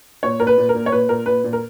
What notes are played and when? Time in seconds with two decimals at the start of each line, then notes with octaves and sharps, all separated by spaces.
0.23 A#2 C#5
0.40 A#2 A#4
0.47 B4
0.58 A#2
0.69 A#4
0.74 A#2
0.86 C#5
0.92 A#2 B4
1.09 A#2 A#4
1.26 A#2 B4
1.44 A#2
1.53 A#4